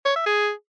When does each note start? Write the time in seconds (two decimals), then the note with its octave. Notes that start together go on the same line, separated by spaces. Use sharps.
0.05 C#5
0.16 E5
0.26 G#4